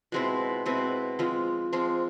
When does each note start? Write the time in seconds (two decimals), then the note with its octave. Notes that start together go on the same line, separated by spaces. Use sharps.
0.12 B2 G#3 C4 E4
0.66 B2 G#3 C4 E4
1.19 F3 G#3 C4 F4
1.73 F3 G#3 C4 F4